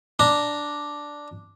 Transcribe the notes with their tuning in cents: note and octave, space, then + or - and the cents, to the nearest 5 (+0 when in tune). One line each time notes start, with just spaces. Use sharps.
D4 +0 A#5 +0